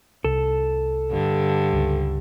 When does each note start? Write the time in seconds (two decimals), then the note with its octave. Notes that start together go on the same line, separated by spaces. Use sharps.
0.25 C2 A4
1.11 G2 D3
1.73 C#2